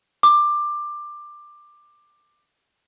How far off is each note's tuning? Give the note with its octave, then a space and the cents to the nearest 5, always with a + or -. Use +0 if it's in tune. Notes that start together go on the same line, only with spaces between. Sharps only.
D6 +15